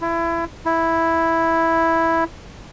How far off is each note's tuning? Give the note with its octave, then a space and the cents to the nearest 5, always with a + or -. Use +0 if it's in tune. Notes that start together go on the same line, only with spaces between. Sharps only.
E4 +25
E4 +0